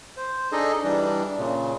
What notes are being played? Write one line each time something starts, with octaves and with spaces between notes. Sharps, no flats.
C5
D4 D#4 G#4 A4 D#5
E3 G3 D4
A#2 C#3